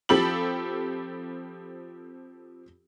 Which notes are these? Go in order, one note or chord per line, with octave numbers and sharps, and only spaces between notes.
F3 C4 G4 A4 B5 F#7